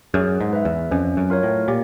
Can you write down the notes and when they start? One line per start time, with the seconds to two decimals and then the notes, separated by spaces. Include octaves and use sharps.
0.14 F#2 G#4
0.40 G#2
0.53 B4 E5
0.65 E2
0.91 F2 C#4
1.17 F#2
1.30 F4 A#4 C#5
1.43 A2
1.68 A#2 G4